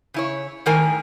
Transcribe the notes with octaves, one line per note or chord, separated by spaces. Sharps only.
C#3 E4 C#5
A2 D#3 A#4 G#5